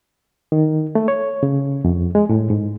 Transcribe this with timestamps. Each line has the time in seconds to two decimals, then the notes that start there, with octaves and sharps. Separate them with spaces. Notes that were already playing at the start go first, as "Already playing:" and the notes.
0.52 D#3
0.95 A3
1.08 C#5
1.43 C#3
1.85 F2
2.15 G#3
2.29 A2
2.50 G#2